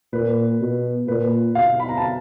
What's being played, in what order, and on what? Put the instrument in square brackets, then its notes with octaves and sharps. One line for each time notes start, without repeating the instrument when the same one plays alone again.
[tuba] A#2 [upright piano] B4
[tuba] B2
[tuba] A#2 [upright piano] B4
[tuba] B2 [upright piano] F5
[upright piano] B5
A#5
A5